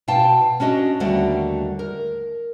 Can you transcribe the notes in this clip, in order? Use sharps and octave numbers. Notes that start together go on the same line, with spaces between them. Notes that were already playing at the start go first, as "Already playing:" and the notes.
B2 F5 G5 A5
C#4 D4 F#4 D#5
D#2 D3 G3 A3 F#4 F#5
A#4